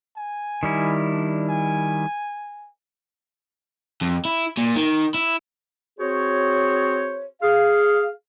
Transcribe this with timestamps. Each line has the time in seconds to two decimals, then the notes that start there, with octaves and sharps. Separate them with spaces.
0.16 G#5
0.63 D#3 G3 E4
1.11 D4
1.48 G#5
4.02 F2
4.25 E4
4.57 A#2
4.76 D#3
5.14 E4
5.99 C4 F#4 G#4 C5 C#5
7.42 G#4 F5